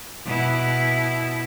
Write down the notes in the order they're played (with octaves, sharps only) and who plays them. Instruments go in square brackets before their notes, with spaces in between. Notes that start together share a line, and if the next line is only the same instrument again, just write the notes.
[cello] B2 E4